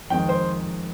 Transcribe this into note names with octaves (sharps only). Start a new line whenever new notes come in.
F2 D#3 G#3 G5
C5